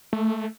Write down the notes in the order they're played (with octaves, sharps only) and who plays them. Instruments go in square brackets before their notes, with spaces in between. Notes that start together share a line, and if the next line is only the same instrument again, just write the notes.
[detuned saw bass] A3